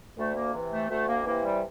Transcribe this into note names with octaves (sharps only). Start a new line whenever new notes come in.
D2 A3
A#3
C3 E3
A3
D2 A3
A#3
C3 E3 A#3
G3